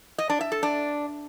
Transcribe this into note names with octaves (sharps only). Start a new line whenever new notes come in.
D#5
D4
E5
A4
D4